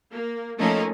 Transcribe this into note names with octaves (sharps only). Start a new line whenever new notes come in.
A#3
F3 A3 A#3 C#4 D#4